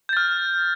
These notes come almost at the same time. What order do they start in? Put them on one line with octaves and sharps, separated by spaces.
G6 A6 F6